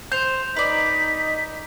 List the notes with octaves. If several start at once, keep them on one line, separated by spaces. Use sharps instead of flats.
C5 G6 F7
D#4 B4 D5 B6